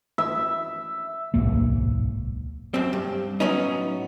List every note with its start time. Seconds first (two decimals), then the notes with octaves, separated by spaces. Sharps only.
0.18 E5
1.34 D1 B1 G#2 A#3
2.74 F#2 C4
2.93 G2
3.40 A2 F#3 B3 C#4 D#4